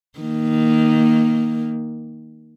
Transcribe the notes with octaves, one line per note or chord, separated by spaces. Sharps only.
D#3 A#3